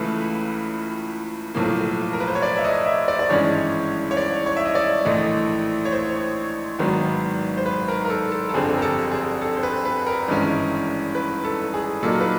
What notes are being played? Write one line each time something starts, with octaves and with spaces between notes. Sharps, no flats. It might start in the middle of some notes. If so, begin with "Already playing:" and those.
Already playing: C#2 C#3 E3 A3 B4
B1 A2 F3 A#3
A#4
B4
C5
C#5
D5
E5
D#5
E5
D5
D5
G#1 G2 E3 G#3 C#4 C#5
C#5
D5
C#5
E5
D#5
D5
A#1 A2 E3 A3 D#5
C#5
C5
G#1 G#2 D#3 F#3 B3
C5
B4
A#4
A#4
A4
A4
A4
G1 F2 D3 G3 C4 G#4
A#4
A4
G#4
A4
C5
B4
B4
A#4
G#1 G2 E3 G#3 C#4
B4
A4
G#4
A#2 F#3 A#3 D#4 A4
B4